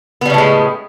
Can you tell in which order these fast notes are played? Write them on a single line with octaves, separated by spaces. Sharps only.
B3 G3 C#3 A2 G#3